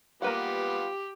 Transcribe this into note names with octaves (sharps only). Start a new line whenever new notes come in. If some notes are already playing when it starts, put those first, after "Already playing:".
G3 A#3 B3 F4 G4 B4 F#5